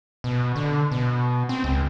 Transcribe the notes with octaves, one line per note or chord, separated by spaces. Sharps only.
B2
D3
B2
C4
C#2